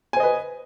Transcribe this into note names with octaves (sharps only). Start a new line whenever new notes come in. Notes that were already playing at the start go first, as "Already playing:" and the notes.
B4 C5 D#5 G#5